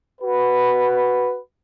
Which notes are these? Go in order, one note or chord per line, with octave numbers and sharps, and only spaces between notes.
F#4 B4